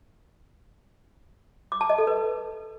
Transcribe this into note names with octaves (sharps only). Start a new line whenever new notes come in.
D6
A5
D#5
A4
B4